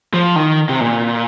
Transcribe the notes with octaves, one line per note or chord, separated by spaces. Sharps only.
F3
D#3
C3
A#2